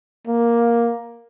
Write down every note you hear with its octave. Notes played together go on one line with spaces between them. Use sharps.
A#3